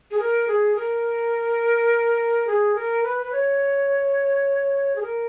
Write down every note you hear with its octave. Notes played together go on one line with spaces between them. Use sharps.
G#4
A#4
G#4
A#4
G#4
A#4
B4
B4
C#5
G#4
A#4